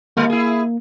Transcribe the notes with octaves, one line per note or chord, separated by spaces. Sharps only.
D#2 G3 A#3
E4 G#4